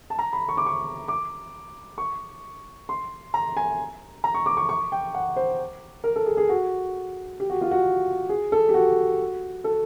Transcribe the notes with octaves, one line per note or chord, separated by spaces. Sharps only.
A5
A#5
B5
C#6
D6
C#6
D6
C#6
C6
A#5
G#5
A#5
C#6
D6
C#6
C#6
G5
F#5
C5
A#4
A4
G#4
G#4
F#4
G4
F#4
F4
F#4
G#4
A4
G4
F#4
A4